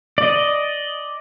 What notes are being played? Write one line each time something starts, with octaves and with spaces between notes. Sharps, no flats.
D5 D#5